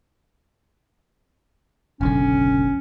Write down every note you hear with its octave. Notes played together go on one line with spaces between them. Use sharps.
F#1 B1 D3 C#4